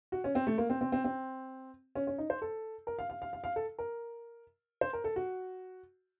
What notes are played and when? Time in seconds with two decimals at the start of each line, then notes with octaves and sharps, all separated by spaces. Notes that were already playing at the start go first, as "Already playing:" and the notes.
0.12 F#4
0.24 C#4
0.35 C4
0.47 A3
0.58 A#3
0.70 C4
0.81 C4
0.92 C4
1.04 C4
1.95 C#4
2.07 C#4
2.18 D#4
2.30 C5
2.42 A4
2.87 A#4
2.99 F5
3.10 F5
3.22 F5
3.33 F5
3.44 F5
3.56 A4
3.79 A#4
4.81 C5
4.93 A#4
5.04 A4
5.16 F#4